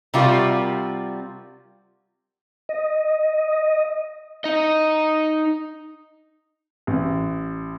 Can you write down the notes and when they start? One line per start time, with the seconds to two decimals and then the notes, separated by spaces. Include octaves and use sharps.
0.14 C3 G3 F4 F#4 A#4 D5
2.69 D#5
4.44 D#4 D#5
6.87 A1